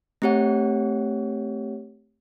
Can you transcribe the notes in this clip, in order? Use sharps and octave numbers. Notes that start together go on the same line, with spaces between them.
A3 C4 G4 C#5 F#5